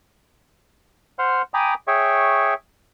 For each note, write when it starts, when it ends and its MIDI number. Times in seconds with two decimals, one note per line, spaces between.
1.19 1.42 72
1.19 1.42 78
1.19 1.42 84
1.19 1.42 89
1.54 1.74 79
1.54 1.74 80
1.54 1.74 82
1.54 1.74 83
1.54 1.74 86
1.54 1.74 87
1.88 2.54 68
1.88 2.54 73
1.88 2.54 76
1.88 2.54 79
1.88 2.54 85